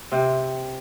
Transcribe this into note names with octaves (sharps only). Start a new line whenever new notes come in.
C3 C4